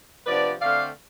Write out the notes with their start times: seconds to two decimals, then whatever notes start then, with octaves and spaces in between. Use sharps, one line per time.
0.25 C3 F3 B3 D4 B4 D5
0.61 D3 A3 C4 D5 F5